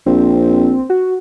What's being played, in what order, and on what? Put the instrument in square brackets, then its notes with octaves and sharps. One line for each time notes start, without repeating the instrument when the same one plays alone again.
[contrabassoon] A#1 [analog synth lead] C4
[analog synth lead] F#4